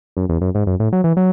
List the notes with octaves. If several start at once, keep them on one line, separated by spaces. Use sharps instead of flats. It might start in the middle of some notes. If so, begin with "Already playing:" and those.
F#2
E2
F#2
G#2
F#2
A2
F#3
E3
F#3